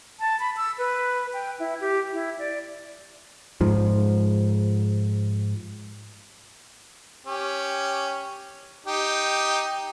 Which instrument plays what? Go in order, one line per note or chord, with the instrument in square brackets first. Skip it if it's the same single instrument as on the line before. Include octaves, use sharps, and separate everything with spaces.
[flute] A5
B5
E6
B4
G5
E4
G4
E4
D5
[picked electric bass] G#2 F3
[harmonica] C#4 G4
D#4 G4